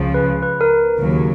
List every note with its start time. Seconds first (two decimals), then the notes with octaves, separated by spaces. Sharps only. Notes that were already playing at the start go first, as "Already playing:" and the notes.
Already playing: C#2 C#3 F3
0.14 B4
0.43 B4
0.61 A#4
0.99 D#2 C#3 F#3